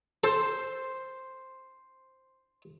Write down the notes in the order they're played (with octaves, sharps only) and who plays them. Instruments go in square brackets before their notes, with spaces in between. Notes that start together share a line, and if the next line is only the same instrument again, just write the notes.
[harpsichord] A4 [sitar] C5